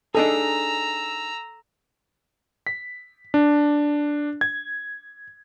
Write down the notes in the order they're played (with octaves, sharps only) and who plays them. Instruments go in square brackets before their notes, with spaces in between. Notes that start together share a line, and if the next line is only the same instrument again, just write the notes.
[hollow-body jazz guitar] D4 D#4 G#4 [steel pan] A4 [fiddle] A#5 E6
[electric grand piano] B6
D4
G#6